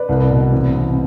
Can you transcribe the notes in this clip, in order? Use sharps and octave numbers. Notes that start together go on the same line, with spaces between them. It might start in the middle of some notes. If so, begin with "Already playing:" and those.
Already playing: B4 D5
C2
B2
A1 C4 E4
A1 C4